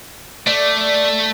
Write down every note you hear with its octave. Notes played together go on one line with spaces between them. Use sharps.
A3 D5